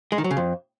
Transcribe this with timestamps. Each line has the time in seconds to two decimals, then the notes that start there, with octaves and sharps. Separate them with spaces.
0.12 G#3
0.18 D#3
0.24 F#3
0.31 C#3
0.37 F2